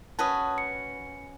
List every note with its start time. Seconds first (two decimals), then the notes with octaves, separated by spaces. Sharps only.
0.19 C#4 F#4 B4 A5 D#6
0.58 C#7